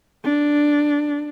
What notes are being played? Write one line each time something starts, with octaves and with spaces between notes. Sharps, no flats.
D4